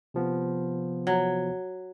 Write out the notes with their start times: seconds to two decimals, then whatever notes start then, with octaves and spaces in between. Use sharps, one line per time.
0.14 C3 F3 B3
1.07 F#3